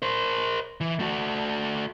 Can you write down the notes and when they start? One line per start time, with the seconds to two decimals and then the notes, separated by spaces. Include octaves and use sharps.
0.02 A#4 C5
0.81 E3
0.99 A3 F#4